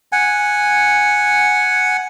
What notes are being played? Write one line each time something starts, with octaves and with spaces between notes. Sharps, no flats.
F#5 G#5